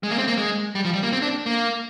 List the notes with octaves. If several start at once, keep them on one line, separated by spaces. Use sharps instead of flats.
G#3
A#3
C4
A#3
G#3
G3
F3
G3
A#3
C4
D4
A#3